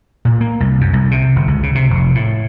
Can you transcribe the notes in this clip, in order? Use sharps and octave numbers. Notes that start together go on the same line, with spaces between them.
A#2
A#3
C2
F#2
C2
C3
G1
C#2
C#3
C3
F1
A2